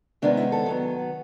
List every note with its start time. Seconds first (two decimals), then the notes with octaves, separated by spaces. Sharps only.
0.22 C3 D#3 G#3 B3 D4
0.37 E4
0.52 A4
0.66 D#3 F#3 B3